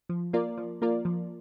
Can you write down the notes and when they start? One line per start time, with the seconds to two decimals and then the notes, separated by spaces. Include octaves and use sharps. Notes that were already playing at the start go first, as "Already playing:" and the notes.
0.09 F3
0.33 A#3 F4 A#4 D5
0.57 F3
0.82 A#3 F4 A#4 D5
1.05 F3